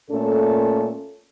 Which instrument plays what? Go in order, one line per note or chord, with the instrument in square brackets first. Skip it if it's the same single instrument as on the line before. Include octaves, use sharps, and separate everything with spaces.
[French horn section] A#2 A3 C#4 A4